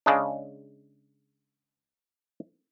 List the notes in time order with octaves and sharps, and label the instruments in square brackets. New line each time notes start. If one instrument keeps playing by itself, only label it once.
[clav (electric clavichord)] C#3 G#3 D4